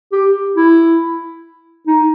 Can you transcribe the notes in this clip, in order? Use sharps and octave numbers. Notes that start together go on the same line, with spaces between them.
G4
E4
D#4